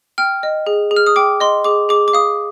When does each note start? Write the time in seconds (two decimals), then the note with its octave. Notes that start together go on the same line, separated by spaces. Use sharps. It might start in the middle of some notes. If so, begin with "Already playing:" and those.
0.18 G5 F6
0.43 D#5
0.67 G#4
0.91 G#4
0.96 F6
1.07 D#6
1.16 G5 D6
1.40 D#5 C6
1.64 G#4 D6
1.89 G#4 D6
2.08 D6
2.13 F5 D#6